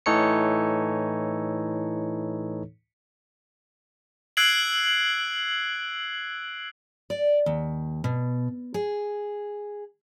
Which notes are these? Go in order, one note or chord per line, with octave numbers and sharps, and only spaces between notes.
A2 E3 D#4 A4 C#5 C#7
E6 F#6 G#6 C7 D7 F#7
D5
D#2
B2
G#4